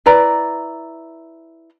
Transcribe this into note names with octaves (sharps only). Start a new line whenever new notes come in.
E4 B4 D5 A#5